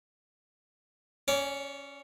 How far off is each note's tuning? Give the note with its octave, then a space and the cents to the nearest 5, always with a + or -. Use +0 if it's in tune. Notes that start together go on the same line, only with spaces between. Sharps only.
C#4 +0 D5 -35